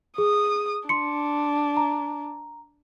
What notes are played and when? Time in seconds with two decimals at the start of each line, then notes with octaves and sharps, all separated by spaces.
0.18 G#4 D#6
0.89 D4 C6 C#7
1.77 A#5